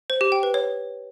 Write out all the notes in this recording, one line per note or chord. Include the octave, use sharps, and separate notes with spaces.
C5
G4
G5
B4
C#5